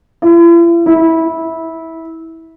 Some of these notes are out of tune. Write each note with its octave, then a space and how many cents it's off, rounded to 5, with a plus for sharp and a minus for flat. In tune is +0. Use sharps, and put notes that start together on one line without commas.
E4 +45
E4 -20